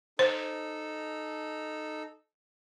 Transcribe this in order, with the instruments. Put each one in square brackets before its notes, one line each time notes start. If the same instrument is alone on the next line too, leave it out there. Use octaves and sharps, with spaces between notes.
[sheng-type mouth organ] D#4 A4 [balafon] C5